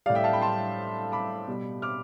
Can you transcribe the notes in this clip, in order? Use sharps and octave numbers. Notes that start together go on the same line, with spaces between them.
A2 G3 D5 F5
E5 G5
F5 A5
G5 B5
A5 C6
B5 D6
B2 G3
D6 F6